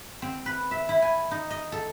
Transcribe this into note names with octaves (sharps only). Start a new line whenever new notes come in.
C4
B4
E5
E4
G#5
D#4
D#5
A4